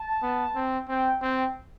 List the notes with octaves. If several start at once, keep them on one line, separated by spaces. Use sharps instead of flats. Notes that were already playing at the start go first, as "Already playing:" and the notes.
Already playing: A5
B3
C4
C4 G5
C4 G5